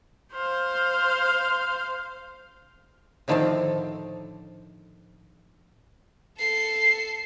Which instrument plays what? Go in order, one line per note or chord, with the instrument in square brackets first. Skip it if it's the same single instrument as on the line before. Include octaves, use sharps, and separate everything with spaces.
[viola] C5 F5
[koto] A2 D3 D#3 F3 C4 A4
[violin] A4 C7